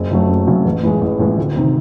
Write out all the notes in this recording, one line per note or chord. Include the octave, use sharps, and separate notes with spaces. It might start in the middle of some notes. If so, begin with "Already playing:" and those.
Already playing: F#1
F#2 C#3 F#3 A3
F#1
F#2 C#3 F#3 A3
A1
A2 E3 G#3
A1
A2 E3 G#3
D2
C3 D#3